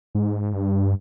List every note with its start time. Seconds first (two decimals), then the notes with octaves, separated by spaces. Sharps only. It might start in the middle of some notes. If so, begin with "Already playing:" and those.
0.15 G#2
0.54 G2